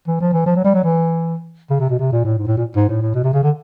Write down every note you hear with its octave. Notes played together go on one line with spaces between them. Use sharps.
E3
F3
E3
F3
F#3
G3
F#3
E3
C#3
C3
B2
C3
A#2
A2
G#2
A2
A#2
G#2
A2
A2
B2
C3
C#3
D3